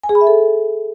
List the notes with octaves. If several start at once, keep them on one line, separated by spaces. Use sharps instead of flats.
G#5
G#4
B5
E5
A4